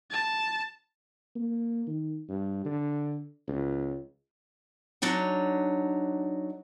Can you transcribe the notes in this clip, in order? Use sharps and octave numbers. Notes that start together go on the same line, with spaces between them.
A5
A#3
D#3
G2
D3
C#2
F#3 D4 D#4 C#5